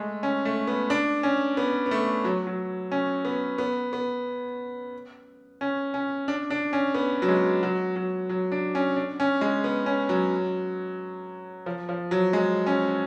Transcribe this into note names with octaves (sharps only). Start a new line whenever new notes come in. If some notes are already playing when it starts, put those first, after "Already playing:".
Already playing: G#3 A3
C#4
A3
B3
D4
C#4
B3
B3
A3
F#3
F#3
C#4
B3
B3
B3
C#4
C#4
D4
D4
C#4
B3
F#3
G#3
F#3
F#3
F#3
D4
C#4
D4
C#4
G#3
B3
C#4
F#3
F3
F3
F#3
G#3
C#4